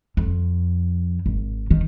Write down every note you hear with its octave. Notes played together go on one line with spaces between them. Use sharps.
F2
G#1
D#3